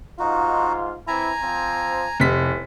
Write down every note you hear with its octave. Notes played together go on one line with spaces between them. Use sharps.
G#2 D#4 F4 F#4
E3 C4 E4 G#5 A#5
F3 C4 C5
F1 E2 B6